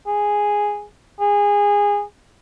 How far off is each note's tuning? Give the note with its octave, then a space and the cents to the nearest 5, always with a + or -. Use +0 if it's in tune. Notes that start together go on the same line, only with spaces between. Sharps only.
G#4 -5
G#4 -20